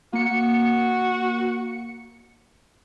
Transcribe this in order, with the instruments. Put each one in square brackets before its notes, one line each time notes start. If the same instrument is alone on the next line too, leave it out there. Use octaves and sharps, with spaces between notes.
[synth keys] A#3 C#7 [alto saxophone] F#4